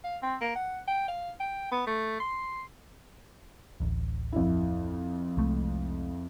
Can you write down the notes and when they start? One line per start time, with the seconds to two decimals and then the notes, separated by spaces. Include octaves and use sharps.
0.04 F5
0.23 C4
0.41 A#3
0.56 F#5
0.88 G5
1.08 F5
1.40 G5
1.71 B3
1.87 A3
2.20 C6
3.80 D1 A1
4.32 F2 E4
5.37 C2 G#3 A3